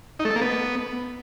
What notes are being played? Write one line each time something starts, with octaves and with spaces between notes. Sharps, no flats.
D#4
A3
A4
A#3
B3